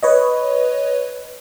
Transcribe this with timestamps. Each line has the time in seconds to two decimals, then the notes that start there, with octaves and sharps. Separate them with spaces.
0.03 B4 C#5 D#5